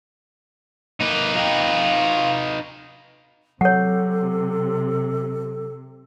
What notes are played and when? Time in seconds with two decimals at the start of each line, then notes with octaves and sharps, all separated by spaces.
1.01 A#3 D#4 B4
1.35 F4 G5
3.61 C3 F#3 A4 C#5 F#5